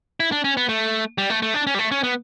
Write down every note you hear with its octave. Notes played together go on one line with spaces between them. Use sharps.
E4
D4
C#4
B3
A3
G3
A3
A3
D4
C#4
G3
A3
C#4
B3